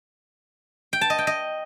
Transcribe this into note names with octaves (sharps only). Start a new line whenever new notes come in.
G5
A5
D#5
G5
D#5